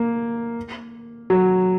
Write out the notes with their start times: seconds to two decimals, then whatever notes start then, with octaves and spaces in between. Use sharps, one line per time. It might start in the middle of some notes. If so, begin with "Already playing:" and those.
Already playing: A#3
1.30 F#3